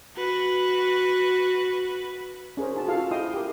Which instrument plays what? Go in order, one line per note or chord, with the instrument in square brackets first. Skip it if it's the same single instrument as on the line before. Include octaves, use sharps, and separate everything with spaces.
[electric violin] F#4 B4
[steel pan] C#4 G#4 A#4 C5
D#4 F#4 A5
F4 F#4 G#4 A4 F5
E4 D#5 G5 C6 D#6
G4 A#4